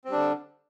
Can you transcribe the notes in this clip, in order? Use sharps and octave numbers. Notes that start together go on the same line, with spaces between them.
D3 G3 C4 D4